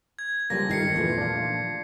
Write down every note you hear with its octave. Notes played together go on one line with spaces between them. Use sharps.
G#6
C#3 F3 G3 G#3 A#3 A#6
G2 D#3 E4 F4 A4 A#6 C7 C#7
E2 A#2 E3 F3 A3
D4 F4